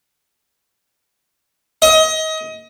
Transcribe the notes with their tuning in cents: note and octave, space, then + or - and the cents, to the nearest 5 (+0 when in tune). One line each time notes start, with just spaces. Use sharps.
D#5 +30